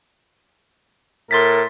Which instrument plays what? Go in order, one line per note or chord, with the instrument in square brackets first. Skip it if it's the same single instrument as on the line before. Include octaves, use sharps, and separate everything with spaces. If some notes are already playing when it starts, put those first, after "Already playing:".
[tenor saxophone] A2 [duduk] A#4 [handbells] C6 A6 B6